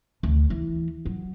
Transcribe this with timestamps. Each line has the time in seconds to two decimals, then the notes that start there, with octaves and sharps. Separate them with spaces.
0.23 D2
0.50 E3
1.06 F#3